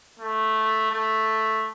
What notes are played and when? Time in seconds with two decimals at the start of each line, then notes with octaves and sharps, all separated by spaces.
0.20 A3
0.92 A3